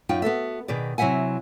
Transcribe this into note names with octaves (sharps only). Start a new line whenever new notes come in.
F#2 D#4 F4 G5
B3 F#4 A4 E5
B2 D#3 G#4 B4 D5
C3 F#3 E4 E5 F#5 G#5